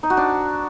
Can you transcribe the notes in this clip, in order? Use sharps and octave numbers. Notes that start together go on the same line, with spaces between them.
D#4
F#4
D4